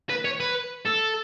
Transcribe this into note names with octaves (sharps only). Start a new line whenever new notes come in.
B4
C#5
B4
A4